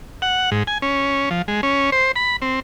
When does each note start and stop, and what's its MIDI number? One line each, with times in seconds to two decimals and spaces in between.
0.22 0.50 78
0.52 0.63 44
0.67 0.78 80
0.82 1.29 61
1.31 1.42 53
1.48 1.61 56
1.63 1.90 61
1.92 2.12 72
2.16 2.36 83
2.42 2.60 60